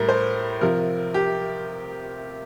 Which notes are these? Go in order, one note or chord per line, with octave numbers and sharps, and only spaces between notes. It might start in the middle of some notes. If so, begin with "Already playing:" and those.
Already playing: A2 G3 A#4
C5
C3 F3 A#4
G4